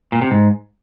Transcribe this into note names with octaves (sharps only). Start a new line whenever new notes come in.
A#2
C3
G#2